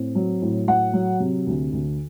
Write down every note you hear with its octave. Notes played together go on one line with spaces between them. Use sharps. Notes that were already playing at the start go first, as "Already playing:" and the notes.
Already playing: A2 C4
F#3
A2
F#3 F#5
F#3
C3
D2
D2